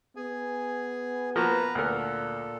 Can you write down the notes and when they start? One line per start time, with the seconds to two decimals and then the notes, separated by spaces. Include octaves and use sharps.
0.16 B3 G#4 G#5
1.36 F3 A#3 F#4 B4 A#5
1.75 D2 A#2 A4 A#4